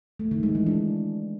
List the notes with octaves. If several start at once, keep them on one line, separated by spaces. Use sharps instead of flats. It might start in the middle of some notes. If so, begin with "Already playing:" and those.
A3
D#3
G#3
E3
D4